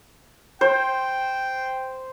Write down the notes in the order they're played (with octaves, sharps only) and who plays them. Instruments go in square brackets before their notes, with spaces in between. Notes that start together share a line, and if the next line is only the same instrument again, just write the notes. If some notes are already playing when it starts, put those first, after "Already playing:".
[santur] C5 [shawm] G5